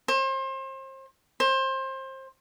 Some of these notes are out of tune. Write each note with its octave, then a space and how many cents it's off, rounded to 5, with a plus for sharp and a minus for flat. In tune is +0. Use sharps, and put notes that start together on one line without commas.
C5 +35
C5 +25